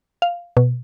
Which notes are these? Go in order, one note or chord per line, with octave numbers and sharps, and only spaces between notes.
F5
B2